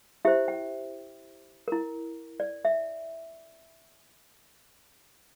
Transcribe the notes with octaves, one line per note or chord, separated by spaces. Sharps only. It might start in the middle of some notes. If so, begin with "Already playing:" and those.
E4 G4 C5 E5
G5
E4 A#4
D5
E5